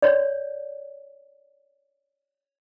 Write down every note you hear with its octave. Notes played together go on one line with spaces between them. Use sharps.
C#5 D5